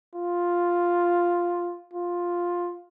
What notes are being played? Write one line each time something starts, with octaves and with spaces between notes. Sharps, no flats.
F4
F4